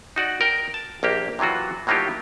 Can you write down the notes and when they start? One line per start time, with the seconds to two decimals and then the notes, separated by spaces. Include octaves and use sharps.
0.16 D#4 F#4 D5
0.41 A#4 G5
0.74 A5
1.03 A#1 A#3 G4
1.39 C3 E3 F#3 F4 F#4
1.87 A2 F#3 A#3 D#4 F4 G4